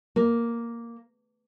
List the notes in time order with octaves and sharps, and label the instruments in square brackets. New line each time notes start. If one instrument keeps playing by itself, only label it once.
[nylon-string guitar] A#3